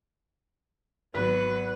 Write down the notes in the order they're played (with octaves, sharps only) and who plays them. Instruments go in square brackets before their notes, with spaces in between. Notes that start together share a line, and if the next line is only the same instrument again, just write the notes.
[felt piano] G#1 B6 [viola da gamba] F#3 B3 [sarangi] B4